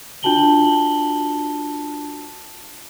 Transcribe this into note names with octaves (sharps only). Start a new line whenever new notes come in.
D4 F4 F#4 A5 F#7 G7